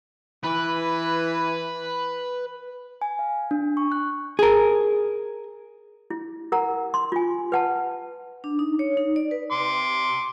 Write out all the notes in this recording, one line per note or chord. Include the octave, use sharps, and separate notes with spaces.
E3 B4
G#5
F5
D4
C#6
F#6
G#4 A#4
E4
A#4 F#5 A#5
C6
F4 G#5
B4 F#5 A5
D4
D#4
C#5
D#4
D5
B4
C6 D6